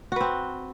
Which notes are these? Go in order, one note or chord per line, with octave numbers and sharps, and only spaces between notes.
C4 F#4 B4